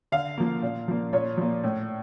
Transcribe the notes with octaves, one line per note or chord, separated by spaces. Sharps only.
D3 F5
F3 A#3
A#2
F3 A#3
A#2 C#5
F3 A#3
A2